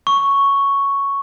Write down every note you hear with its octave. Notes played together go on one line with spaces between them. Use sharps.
C#6